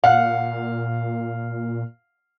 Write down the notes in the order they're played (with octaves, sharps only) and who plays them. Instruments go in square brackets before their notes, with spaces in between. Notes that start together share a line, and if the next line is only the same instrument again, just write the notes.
[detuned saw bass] A#2 [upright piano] F5 [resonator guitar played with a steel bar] F#5